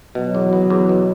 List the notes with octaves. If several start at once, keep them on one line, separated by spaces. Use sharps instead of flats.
B2 F#3
E2
B3
E2
B2